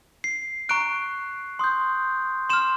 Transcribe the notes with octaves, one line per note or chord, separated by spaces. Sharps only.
C7
A#5 C#6 F#6 D7
C6 D#6 G6
C6 F6 E7